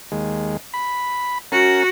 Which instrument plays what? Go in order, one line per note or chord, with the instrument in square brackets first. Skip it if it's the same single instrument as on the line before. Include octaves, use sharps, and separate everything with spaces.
[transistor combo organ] D#2 G#3
B5
[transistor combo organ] C#4 A#4 [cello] F#4